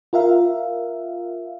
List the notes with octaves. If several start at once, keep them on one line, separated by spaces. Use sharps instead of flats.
F4 A#4 E5 F5